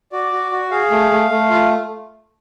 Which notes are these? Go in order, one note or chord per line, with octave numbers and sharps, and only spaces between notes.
F#4 D5
F#4
F#4
G#4 F5
A3
A3
A3
F4